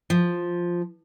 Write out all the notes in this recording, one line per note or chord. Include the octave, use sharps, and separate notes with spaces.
F3